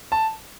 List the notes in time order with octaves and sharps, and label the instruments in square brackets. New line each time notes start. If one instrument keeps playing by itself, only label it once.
[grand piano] A5